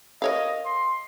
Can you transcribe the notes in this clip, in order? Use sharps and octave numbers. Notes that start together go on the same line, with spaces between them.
A#4 C#5 D#5 F5
C6